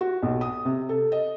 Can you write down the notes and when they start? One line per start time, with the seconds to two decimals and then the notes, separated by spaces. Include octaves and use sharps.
0.01 F#4
0.22 B1
0.41 D#6
0.65 C3
0.89 A4
1.12 D#5